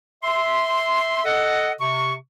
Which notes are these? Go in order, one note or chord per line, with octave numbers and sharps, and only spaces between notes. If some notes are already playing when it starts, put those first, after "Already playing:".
E5 C6
A4 D#5 F#5
C3 C#6